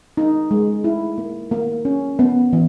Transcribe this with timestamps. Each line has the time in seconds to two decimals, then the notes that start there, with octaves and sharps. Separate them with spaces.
0.17 D#4
0.51 G#3
0.84 E4
1.18 A#3
1.51 A#3
1.85 C#4
2.19 B3
2.53 E3